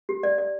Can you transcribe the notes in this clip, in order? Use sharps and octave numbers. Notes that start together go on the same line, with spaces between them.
G4
D5
D5